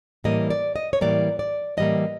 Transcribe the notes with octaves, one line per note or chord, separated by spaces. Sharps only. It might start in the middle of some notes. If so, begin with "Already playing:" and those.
A2 E3 G3 A#3 D#5
D5
D#5
C#5
A2 E3 G3 A#3 D5
D5
A2 E3 G3 A#3 D#5